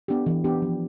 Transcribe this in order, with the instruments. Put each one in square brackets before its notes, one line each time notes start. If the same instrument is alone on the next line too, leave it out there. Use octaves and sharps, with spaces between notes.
[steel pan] B3 D4 G4
E3
B3 D4 G4
F3